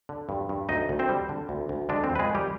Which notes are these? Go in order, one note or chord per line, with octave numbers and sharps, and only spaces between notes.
D3
G2
G2
D2 D#4 D#5
D2
C4 C5
G3
D3
D2
D2
D3 G#3 D4
C4
F2
B4
G#3 G#4
D#3
G3 G4